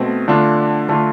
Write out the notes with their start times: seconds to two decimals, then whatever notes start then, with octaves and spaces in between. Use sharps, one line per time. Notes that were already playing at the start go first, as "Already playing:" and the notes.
Already playing: B2 A3 C4
0.28 D3 A3 D4 F4
0.89 D3 A3 D4 F4